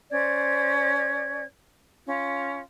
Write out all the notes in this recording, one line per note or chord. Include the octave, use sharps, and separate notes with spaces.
C#4 C5 D5 G#6
C#4 F4